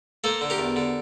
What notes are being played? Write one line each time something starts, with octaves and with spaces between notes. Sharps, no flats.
A#3 A4 C5
D3
G4 A#4
E2
D3